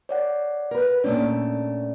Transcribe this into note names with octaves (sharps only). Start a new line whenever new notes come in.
C#5 D5 F#5
A#4 B4
A#2 A3 C#4 D4 C#5 D5